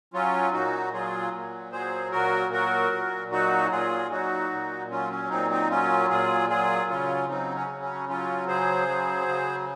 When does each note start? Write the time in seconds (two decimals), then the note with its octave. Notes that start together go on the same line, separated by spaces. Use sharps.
0.14 F#3 C#4 F4
0.53 A#2 D#4 F#4
0.93 F#3 F4 G#4
1.33 A#2
1.72 F#3 G#4 C5
2.12 A#2 F#4 A#4
2.52 F#3 F#4 A#4
2.92 A#2
3.31 F#3 D#4 F#4
3.71 A#2 F4 G#4
4.11 F#3 D#4 F#4
4.51 A#2
4.91 F#3 C#4 F4
5.11 C#4
5.30 A#2 C4 D#4
5.50 C4 D#4
5.70 F#3 C#4 F4
6.10 A#2 F4 G#4
6.49 F#3 F4 G#4
6.89 C#3 C#4 F4
7.29 F#3 C4 D#4
7.55 C#4
7.69 C#3
7.82 C#4
8.08 F#3 C#4 F4
8.48 C#3 G#4 C5
8.88 F#3
9.28 C#3